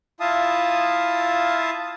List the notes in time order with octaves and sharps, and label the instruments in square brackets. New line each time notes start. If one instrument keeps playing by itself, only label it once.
[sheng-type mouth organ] E4 F4 E5 F5 A5 D#6